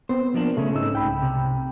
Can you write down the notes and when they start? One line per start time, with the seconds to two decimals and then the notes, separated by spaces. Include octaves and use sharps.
0.09 B3 C4 C5
0.34 F3 A#3 D4
0.57 C#3 A3 C#4
0.75 G#2 D#4 E6
0.93 C2 G5 B5
1.22 C3